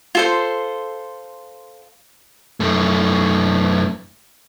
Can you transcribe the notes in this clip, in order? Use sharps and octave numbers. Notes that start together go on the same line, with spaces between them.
F4 A4 C5
F#2 A3